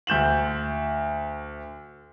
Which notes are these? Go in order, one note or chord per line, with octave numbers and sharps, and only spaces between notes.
D2 G6 E7 F#7